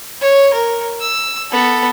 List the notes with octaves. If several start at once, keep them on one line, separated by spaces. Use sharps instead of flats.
C#5
A#4
E6
B3 A4